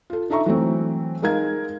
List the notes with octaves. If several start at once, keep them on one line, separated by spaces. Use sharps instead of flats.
F4 A4
D4 D#4 A4 E5 A#5 C#6
E3 F#3 A3 C4
G#3 D#4 A#4 F5 G#6